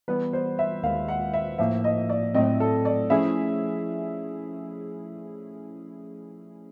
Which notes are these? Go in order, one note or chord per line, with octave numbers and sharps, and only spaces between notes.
E3 G3 B3 B4
C5
E5
D#2 D#3 G#3 F5
F#5
E5
A2 F3 A#3 E5
D#5
D5
A2 F#3 A3 C4 D#5
A4
D5
F3 A3 C#4 E4 G#4 E5